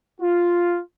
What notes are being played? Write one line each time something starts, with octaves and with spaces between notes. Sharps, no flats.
F4